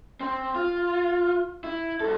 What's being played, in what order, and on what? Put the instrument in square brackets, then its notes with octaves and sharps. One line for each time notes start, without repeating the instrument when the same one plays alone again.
[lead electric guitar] C4
F4
E4
C2 A4